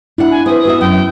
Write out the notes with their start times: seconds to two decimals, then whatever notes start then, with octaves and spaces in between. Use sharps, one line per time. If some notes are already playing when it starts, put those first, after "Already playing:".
0.18 D4 E4 F#5
0.31 G#5
0.46 C4 B4 D#6
0.65 B3 F#4 E5
0.81 F#2 G5